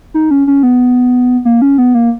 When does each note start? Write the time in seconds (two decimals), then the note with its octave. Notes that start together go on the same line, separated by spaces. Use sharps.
0.14 D#4
0.31 C#4
0.47 C#4
0.63 B3
1.45 A#3
1.62 C#4
1.78 B3
1.94 A#3